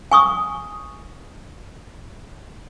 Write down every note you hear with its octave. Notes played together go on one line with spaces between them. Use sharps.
G#5 C#6 D#6